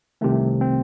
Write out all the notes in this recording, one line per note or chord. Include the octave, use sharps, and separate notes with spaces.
C2 C3 D#3 A3
C4